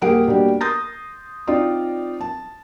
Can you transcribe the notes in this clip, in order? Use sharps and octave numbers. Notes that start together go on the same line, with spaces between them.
D#1 A#3 G4 G#4 F#5 D7
B2 G3 A#3 D4 G4 A#4
C6 D#6 G6 A6 A#6
C4 D#4 F4 D5 D#5
A5